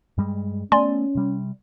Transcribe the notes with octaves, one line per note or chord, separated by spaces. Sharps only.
G2 G3 G#3
A3 B3 C#4 D5 G#5 C6
C3 G3